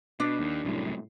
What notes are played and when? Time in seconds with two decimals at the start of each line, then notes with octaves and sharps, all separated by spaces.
0.20 B2 D4
0.39 D#2
0.65 C2 F#2 A2